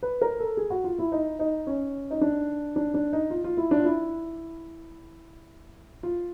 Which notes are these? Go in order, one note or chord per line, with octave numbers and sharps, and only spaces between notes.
B4
A#4
A4
G#4
F#4
F4
E4
D#4
D#4
C#4
D#4
D4
D4
D4
D#4
F4
F4
E4
D4
F4
E4
F4